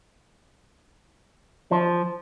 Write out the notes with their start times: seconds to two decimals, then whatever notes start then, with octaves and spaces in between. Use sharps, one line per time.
1.71 F3